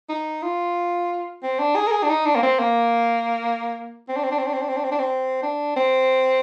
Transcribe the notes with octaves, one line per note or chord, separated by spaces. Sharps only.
D#4
F4
C4
D4
G#4
A#4
G#4
D4
D#4
D4
A#3
C4
A#3
C4
D4
C4
D4
C4
D4
C4
D4
C4
D4
C4
D4
C4
D4
C4